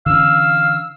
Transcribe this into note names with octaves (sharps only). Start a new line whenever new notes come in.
D3 E3 C#4 F5 E6